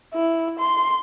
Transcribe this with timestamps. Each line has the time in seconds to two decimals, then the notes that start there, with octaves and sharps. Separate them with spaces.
0.14 E4
0.60 C6